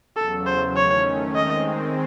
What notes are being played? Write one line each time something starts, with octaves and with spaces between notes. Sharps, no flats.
E2 C#3 F#3 A4
C5
D#3 A3 C#4 C#5
D#3 G#3 C4 D#5